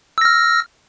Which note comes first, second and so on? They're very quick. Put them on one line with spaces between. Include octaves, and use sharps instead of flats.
E6 A#6 F6